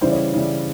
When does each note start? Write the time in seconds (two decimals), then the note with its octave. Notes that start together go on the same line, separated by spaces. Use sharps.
0.01 C#3 E3 G3 C5
0.12 C#5
0.34 C#3 E3 G3